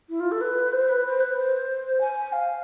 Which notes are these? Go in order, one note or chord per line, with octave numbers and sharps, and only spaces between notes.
E4
F4
A4
B4
C5
B4
C5
B4
C5
G#5
F5